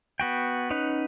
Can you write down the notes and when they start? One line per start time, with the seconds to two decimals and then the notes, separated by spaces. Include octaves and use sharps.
0.20 B3 F#4 G5
0.70 C#4 D#4 B4 F#5